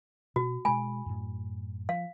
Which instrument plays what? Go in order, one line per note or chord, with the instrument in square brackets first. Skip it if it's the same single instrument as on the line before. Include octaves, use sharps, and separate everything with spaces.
[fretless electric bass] B2 [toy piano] F#4
[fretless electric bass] B2 G#3 [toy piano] G#5 B5
[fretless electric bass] F#2 A2
[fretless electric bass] F3 [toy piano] F5